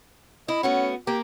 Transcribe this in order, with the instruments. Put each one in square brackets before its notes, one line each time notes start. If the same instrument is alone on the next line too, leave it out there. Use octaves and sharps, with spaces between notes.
[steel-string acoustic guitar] E4 [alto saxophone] D#5
[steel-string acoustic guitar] A3 B3 F#4 [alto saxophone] C#4
[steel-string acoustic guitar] A#3 [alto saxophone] G4